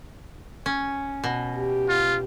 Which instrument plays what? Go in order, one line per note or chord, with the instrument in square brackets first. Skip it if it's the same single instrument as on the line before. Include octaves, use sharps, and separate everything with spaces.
[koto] C#4
B2
[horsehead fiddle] G4
[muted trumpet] F4